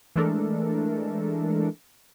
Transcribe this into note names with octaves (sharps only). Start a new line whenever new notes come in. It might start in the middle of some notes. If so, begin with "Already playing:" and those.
E3 G#3 A3 D4 A4 A#4